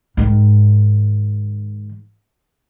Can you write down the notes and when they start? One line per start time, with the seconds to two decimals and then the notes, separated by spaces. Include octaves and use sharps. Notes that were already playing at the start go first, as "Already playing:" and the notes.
0.17 G#2 D#3